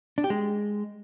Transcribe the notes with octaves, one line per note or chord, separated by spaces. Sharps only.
D4
G4
G#3